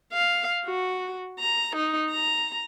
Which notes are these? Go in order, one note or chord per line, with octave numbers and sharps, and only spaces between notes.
F5
F#4
A#5
D#4
A#5